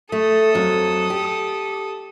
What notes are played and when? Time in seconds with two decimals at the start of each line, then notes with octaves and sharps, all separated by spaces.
0.12 A3 A4 D#6
0.55 F2 F#3
1.10 G4